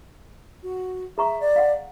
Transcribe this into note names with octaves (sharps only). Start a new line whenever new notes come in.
F#4
G#4 E5 A#5 C#6
D5
F5 F#5